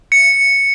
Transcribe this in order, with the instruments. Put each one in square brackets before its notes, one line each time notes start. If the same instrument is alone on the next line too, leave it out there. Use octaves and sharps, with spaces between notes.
[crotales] C#7